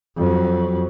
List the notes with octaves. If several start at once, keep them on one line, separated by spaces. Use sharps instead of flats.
F2 F#3